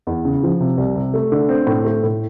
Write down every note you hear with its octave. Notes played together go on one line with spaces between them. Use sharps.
E2
C#3
F3
C3
C2
C3
A3
D3
C4
A2
A3
A2